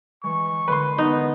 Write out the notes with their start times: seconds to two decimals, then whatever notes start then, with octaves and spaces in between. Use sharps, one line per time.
0.24 E3 G#3 C#6
0.68 D3 G#3 A#3 B4 C6
0.98 B3 D#4